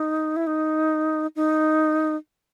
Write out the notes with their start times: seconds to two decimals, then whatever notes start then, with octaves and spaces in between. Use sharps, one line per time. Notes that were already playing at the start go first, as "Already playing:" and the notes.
Already playing: D#4
0.36 E4
0.47 D#4
1.36 D#4